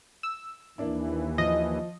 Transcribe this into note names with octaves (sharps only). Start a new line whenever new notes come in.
E6
D#2 E3 A#3 D4 E4
F3 D#5